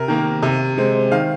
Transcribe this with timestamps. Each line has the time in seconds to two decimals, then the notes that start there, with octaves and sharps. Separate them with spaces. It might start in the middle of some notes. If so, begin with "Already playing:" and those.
Already playing: C3 A#4
0.08 D#3 A#3
0.42 C3
0.78 G#3 C4
1.11 D#3 F5